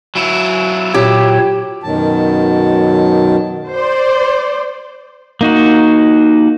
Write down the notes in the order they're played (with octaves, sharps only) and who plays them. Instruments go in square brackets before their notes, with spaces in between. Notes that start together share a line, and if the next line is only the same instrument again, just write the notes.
[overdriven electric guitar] F#3 E4
[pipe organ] A#2 C#5 [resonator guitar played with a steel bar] G4
[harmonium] F#2 B2 D#3 F#3 A5
[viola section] C5 D5
[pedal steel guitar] A#3 D#4 F#4